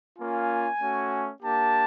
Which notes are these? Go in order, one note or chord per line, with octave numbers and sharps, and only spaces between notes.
A#3 C#4 F4 G#5
A3 C#4 F#4
A#3 D4 G4 A5